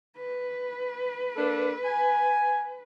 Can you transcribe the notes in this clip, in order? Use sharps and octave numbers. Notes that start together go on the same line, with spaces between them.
B4
A#3 D4 A4
G#5